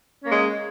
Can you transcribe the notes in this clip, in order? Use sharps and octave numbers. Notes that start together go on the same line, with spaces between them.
G#3 A#3 C#4